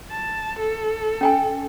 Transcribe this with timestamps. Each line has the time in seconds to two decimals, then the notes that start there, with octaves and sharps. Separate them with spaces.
0.11 A5
0.59 A4
1.21 C#4 G5 G#5